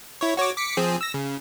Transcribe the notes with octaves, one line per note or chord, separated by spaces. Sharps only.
E4 C#5
F#4 C#5 D6
D6 B6 C#7
F3 C4 G#4
E6 A#6
C#3